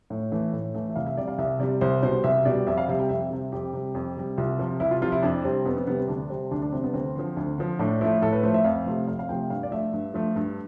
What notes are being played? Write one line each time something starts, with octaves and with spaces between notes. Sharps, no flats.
A2
E3 A3
A2
E3 A3
E5
C2 F5
E5
C3 G3 D5
F5
C2 E5
C3 G3 D5
C2 C5
B2 G3 C5
C2 E5
B2 G3 D5
F2 E5
F5
C3 G3 E5
G5
F2 E5
C3 G3 E5
F2 G4
C3 G3
F2
C3 G3
C2 F4
C3 F3
C2 E4
F4
C3 F3 F4
E4
F2 D4
C3 G3 C4
F2 B3
B3
C3 G3 B3
C4
D2 D4
C3 G3 C4
D2 D4
D4
C3 G3 C4
B3
D2 C4
D3 F3
D2
D3 F3
A2 D4
F3 A3 E4
A2 A4
B4
F3 A3 C5
E5
F2 F5
C3 F3 A3
F2 F5
F5
C3 F3 A3 G5
G2 F5
D5
F3 A3 E5
G2
F3 A3
G2